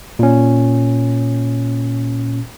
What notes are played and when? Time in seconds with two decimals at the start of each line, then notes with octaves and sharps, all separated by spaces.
0.19 A#2 C#4